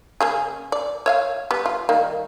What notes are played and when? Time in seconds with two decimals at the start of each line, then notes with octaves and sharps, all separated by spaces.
0.21 C#3 A#3 G#4
0.72 D5
1.06 C#5 E5 F5
1.51 G3 B3
1.66 F4
1.89 D#3 G3 A#3